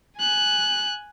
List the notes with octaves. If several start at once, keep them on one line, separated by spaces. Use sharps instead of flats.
G#5 F#6